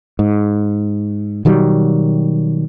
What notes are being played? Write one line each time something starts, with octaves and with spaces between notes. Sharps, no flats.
G#2
B2 D#3 F#3 G3